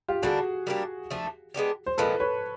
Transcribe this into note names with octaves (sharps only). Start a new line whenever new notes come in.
F4 G4
D3 G3 A#3 D4 F#4 G#4
G3 A#3 D4 G4
F3 A3 D4
G#3 B3 D4 G4
C5
A#2 F3 G#3 C4 A4 B4
B4 C#5